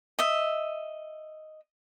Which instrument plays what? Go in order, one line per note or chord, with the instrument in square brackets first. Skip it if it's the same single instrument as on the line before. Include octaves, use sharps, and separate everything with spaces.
[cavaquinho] D#5 E5